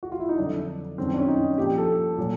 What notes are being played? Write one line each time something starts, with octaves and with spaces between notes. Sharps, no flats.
F#4
F4
E4
D#4
F2 D3 F#3 D4
F#2 D#3 F#3 C4
C4
D4
C#4
D#4
A#2 F3 G4
A4
A#2 F#3